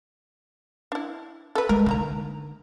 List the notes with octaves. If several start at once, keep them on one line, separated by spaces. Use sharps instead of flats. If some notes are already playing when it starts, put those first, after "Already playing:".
D4 E4
A4 B4
G#3 A#4
D3 D#3 A#3 A#5